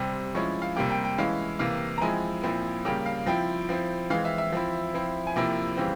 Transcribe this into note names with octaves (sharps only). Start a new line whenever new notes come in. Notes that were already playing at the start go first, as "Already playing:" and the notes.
Already playing: C3 G3 C4
F3 G#3 C#4 E4 C#6
F5
C3 G3 A#3 G5
G5
G5
E3 G#3 C#4 E4 F5
C3 E3 A#3 F5
A#5
F3 G#3 C4 E4 G#5
A#2 F3 C4 E4
C#3 G3 A#3 G5
F5
F3 C4 E4 G5
F3 C4 E4
E3 G#3 C4 F5
E5
E5
F3 C4 E4
F3 C4 E4
G#5
C3 F3 A#3 E4 G5
C#3 E3 G3 C4